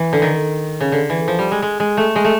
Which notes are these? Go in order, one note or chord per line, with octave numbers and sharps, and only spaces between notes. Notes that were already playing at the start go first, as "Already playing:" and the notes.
Already playing: E3
D3
D#3
C#3
D3
E3
F3
G3
G#3
G#3
G#3
A3
G#3
A3